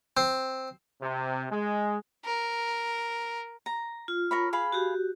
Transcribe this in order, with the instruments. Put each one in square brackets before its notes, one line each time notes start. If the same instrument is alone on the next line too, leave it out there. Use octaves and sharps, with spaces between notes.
[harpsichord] C4
[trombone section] C3
G#3
[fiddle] A#4
[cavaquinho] A#5
[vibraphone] F4
[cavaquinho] A#4 C#5 B5
G#4 F5 B5
[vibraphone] F#4 G4